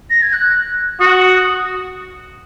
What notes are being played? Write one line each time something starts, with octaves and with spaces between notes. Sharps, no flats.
A#6
G#6
F#6
F#4 D#6